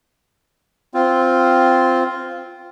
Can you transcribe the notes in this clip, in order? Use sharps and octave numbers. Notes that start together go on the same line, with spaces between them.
C4 F4